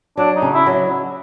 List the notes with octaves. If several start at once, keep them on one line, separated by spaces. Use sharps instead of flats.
F#3 D4
D#4
C#3
E4
F#3